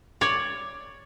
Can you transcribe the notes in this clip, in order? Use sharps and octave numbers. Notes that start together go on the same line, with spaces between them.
C#5 D5